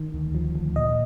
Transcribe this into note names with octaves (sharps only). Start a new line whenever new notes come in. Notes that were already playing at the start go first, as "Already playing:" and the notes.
Already playing: D#3
D2
F3
D2
A#2 D#5